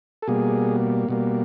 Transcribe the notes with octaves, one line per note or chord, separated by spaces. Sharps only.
A4
B2 G3 A#3 G#4
B2 G3 A#3